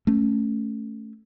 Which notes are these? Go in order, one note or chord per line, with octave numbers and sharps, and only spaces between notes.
A3 C#4